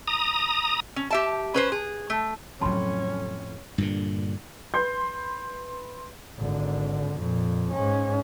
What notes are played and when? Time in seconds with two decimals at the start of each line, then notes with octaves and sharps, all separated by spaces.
0.08 A#5 D#6
0.96 C#4
1.10 G4 E5 A5
1.54 C#4 B4 C5
1.72 G#4
2.10 A3
2.61 F2 A2 C#3 F#3 C#4 A5 B5 C6
3.78 G2 A#2 D3
4.74 B4 C6 G6
6.37 G#1 D3
7.19 F2 A#2
7.72 G#2 C#4